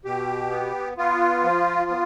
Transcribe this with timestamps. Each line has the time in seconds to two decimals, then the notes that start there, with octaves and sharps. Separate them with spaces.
0.05 B2 G4
0.51 B3
0.98 B3 F4
1.44 F3
1.90 B3